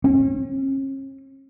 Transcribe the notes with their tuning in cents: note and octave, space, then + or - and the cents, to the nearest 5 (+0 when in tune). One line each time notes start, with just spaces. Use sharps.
C#4 -45